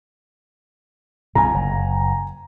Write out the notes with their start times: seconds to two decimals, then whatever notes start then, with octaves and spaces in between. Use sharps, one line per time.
1.35 C2 G2 B2 G#5 A#5
1.54 F#1